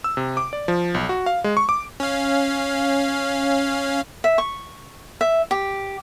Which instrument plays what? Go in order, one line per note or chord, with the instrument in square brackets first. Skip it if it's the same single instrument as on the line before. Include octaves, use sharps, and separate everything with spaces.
[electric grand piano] E6
C3
D6
D5
F3
B1
F#4
F5
G#3
C#6
D6
[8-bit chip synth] C#4 F5
[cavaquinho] E5
C#6
E5
G4